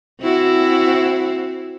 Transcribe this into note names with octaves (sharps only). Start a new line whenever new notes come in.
C4 E4 F#4